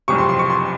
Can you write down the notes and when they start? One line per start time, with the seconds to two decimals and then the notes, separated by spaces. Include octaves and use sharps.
0.08 F#1 F2 C3 C#6
0.18 C6
0.29 C6
0.39 C#6
0.50 C6